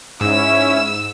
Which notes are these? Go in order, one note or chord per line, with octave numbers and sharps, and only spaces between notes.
G#2 C#4 E4 E6